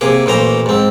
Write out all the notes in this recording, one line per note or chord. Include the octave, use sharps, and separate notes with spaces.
C3 A#3 G#4
A1 A#2 C5 A#5
G#2 C4